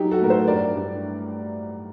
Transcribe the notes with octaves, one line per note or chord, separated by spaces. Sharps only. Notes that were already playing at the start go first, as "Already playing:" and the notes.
Already playing: F#3 D#4 G4
F#4 A4
A2 A#4
A4 C5
G2 A#4 D5
G2